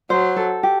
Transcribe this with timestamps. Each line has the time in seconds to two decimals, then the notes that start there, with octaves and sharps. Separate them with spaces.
0.10 F#3 C5
0.37 A4
0.63 G4